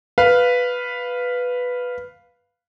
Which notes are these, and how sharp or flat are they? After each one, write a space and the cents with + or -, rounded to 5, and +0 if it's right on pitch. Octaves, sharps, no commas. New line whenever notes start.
B4 +0 F5 +0